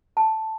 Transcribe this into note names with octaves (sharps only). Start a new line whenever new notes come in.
A5